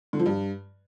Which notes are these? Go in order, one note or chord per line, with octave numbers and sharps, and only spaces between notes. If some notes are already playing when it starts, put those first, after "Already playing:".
D3
F3
G2